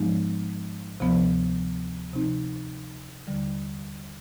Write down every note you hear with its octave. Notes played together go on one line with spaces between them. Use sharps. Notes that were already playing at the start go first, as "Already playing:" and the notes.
Already playing: G#2 F3 G#3 B3 D#4
D2 C3 F3 B3
C3 F3 C4 D#4
D#2 D3 G3